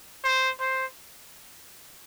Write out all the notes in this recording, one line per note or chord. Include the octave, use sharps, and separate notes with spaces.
C5
C5